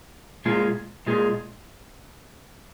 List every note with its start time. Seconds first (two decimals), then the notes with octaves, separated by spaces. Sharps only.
0.45 A#2 G#3 F4 G#4
1.06 A#2 G#3 F4 G#4